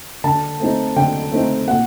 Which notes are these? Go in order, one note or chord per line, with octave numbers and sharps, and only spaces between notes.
D3 A5
A3 C4 D#4
D3 G5
A3 C4 D#4
A#2 F#5